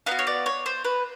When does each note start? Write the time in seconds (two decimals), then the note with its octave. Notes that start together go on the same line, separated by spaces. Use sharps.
0.06 B3 D#4 F5
0.11 F#4
0.19 C#5
0.27 D5
0.46 C#5
0.66 C5
0.84 B4